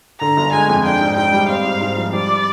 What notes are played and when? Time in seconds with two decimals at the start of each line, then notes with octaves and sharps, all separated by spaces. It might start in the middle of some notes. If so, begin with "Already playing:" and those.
0.20 D3 A#5
0.37 G1
0.52 G#3 G#5
0.69 F2
0.85 D4 G5
1.01 G#2
1.17 G#2 G5
1.33 G3
1.49 C4 F5
1.65 G#2
1.81 G#2
1.97 F3
2.13 G3 D5